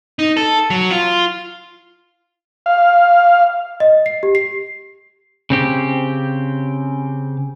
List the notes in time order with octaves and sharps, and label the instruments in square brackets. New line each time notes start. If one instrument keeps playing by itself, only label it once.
[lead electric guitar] D#4
A4
F#3
F4
[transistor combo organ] F5
[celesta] D#5
C7
G4
C7
[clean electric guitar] C#3 C4 G4